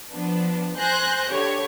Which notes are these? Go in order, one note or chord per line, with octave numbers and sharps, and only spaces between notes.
F3 B3 D4
C5 G#5 F#6 G6 A#6
D3 G4 C#5